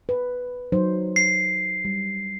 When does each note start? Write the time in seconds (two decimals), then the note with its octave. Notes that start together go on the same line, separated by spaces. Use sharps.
0.09 B4
0.72 F#3 D#4 C5
1.16 C7
1.85 G3